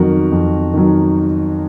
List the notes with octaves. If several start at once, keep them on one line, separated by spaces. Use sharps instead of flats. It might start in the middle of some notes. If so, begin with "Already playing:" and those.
Already playing: F2 D#3 F#3 F#4 A#4
F2
D#3 F#3